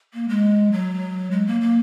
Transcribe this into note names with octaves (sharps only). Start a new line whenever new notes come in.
A#3
G#3
F#3
G#3
A#3
A#3